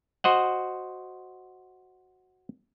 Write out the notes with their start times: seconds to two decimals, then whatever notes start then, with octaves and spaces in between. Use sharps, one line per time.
0.24 F#4 C5 D#5 F#5